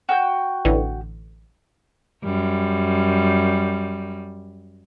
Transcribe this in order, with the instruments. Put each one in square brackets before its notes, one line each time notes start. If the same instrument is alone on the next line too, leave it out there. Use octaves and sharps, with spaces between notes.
[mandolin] F#4 G5 G6
[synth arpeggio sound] A1 D3 E3
[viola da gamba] F#2 G3